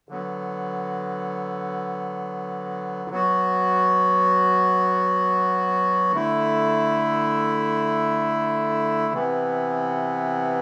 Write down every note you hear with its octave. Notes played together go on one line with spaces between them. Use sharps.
D3 F#3 B3
F#3 B3 F#4
D3 A3 E4
C3 E3 B3